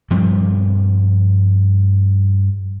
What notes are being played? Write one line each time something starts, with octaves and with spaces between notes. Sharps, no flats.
G2 F3 G3 C4